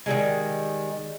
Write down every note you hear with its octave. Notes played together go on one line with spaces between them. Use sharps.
D#3 F3 G3 G#3